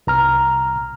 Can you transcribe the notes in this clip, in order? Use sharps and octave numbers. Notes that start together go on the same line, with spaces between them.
C2 A#5 F6